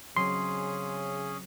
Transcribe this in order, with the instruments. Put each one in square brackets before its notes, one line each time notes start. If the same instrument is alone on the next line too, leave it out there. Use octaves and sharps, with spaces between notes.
[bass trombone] C#3 [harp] F#3 C4 D#5 [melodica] C#4 G#4 [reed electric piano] C6